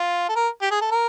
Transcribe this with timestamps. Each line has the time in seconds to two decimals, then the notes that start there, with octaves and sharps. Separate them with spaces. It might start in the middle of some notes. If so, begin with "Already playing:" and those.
Already playing: F4
0.29 A4
0.36 A#4
0.62 G4
0.71 G#4
0.81 A4
0.91 A#4